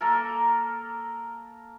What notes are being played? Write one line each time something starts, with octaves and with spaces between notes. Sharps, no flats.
A#3 A4 A#4